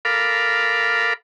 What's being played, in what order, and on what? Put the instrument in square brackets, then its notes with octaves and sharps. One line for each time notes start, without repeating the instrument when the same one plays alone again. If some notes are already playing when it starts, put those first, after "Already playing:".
[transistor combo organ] A4 A#4 F5 B5 D6